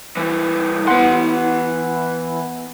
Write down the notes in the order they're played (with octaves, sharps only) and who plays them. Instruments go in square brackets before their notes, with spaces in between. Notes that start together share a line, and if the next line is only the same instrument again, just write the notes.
[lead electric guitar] E3 G3 [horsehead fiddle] E4
[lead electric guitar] E3 C6 [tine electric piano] B3 F#5